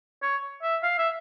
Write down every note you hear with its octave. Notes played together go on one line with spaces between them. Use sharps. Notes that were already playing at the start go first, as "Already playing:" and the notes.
C#5
E5
F5
E5